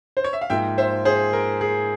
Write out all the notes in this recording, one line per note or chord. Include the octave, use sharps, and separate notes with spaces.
C5
C#5
E5
F5
G#2 F3 A#3 E5 G5
C5 E5
G#4 C5
A#4
G#4